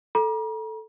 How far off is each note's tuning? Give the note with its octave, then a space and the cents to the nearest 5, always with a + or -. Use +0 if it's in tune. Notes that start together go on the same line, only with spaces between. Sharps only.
A4 +0 A#5 +40